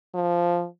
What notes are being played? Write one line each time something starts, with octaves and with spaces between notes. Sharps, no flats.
F3